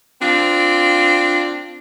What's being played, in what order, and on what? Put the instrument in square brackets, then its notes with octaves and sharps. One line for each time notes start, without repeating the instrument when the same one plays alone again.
[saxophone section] C4 D4 F4